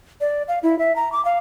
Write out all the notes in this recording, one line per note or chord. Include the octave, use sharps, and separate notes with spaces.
D5
F5
E4
E5
A#5
D6
F5